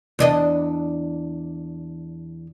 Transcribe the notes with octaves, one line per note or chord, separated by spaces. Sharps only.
E2 D4 D#5